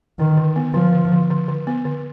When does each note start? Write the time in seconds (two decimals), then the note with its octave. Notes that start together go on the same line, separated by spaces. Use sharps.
0.19 D3 D#3
0.37 D3
0.56 B3
0.74 D3 F3
0.93 D3
1.12 D3
1.30 D3
1.48 D3
1.67 B3
1.85 D3